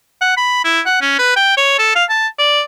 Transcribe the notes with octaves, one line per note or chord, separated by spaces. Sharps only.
F#5
B5
E4
F#5
C#4
B4
G5
C#5
A4
F5
A5
D5